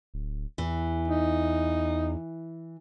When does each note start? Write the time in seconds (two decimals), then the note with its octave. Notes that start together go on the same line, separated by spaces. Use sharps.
0.14 D1
0.58 E2 E3
1.08 D#4